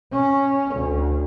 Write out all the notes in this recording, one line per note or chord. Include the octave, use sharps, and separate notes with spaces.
C#4
D2